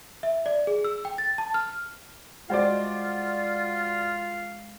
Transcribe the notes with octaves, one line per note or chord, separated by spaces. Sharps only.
E5
D5
G#4
E6
G5
A6
A5
F6
G#3 F4 F#4 C5 D5 F5